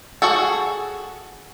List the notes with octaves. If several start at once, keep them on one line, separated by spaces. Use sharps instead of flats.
F#4 G#4 A4